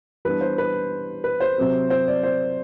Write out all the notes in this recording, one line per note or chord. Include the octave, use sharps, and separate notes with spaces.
E3 G3 B3 D4 B4
C5
B4
B4
C5
C3 F#3 C4
C5
D5
C5